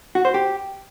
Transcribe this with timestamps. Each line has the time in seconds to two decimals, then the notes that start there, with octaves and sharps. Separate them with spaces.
0.15 F#4
0.25 C5
0.34 G4